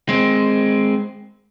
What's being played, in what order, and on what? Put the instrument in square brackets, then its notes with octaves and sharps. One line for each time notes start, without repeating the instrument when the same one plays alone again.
[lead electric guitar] G#3 C4